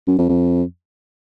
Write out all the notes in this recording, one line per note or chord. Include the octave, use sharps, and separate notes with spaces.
F#2
F2
F2